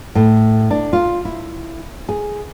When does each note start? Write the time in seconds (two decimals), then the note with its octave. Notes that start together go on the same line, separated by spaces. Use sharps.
0.15 A2
0.71 D4
0.93 F4
1.25 E4
2.09 G#4